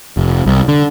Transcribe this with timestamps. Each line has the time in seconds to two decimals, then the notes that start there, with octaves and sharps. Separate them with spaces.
0.17 F1
0.46 C2
0.68 D3